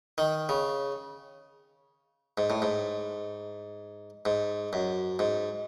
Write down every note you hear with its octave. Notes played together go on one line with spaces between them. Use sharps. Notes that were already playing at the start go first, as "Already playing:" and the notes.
D#3
C#3
G#2
A2
G#2
G#2
F#2
G#2